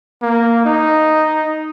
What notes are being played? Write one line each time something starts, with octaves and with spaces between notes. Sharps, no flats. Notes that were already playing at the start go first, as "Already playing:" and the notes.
A#3
D#4